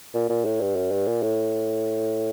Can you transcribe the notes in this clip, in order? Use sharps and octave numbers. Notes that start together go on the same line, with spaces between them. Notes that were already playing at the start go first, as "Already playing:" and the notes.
A#2
A#2
A2
G2
F#2
G2
A#2
A2